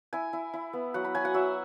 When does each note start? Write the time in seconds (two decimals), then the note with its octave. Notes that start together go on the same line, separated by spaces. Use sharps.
0.13 E4 G#5
0.33 E4
0.54 E4
0.73 B3
0.94 F#3 F#5
1.04 B5
1.15 F#3 G#5
1.25 F#5
1.34 F#3 E5